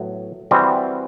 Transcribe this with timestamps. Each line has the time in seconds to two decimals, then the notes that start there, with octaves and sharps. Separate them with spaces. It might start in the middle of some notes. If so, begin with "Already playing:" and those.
Already playing: A2 F#3 B3
0.51 E3 G3 C4 F#4